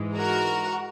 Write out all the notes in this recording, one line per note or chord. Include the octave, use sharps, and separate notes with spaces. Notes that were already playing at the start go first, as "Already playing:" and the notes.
Already playing: G#2 E3 G#3
F#4 A#4